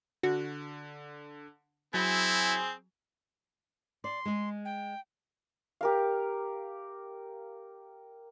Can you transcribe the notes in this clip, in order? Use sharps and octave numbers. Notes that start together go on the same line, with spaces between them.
D3 F#4
F#3 C4 E4 G#4 G#5 B5
D5 C6
G#3 G#4
G5
G4 A#4 F5